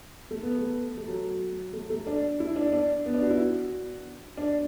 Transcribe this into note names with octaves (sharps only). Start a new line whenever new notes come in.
A3
B3
A3
A3
F#3
A3
A3
D4
E4
D4
D4
B3
D4
F#4
E4
F#4
D4